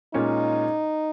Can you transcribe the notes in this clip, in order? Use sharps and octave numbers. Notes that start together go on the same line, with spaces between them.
A#2 G#3 C#4 D#4 F4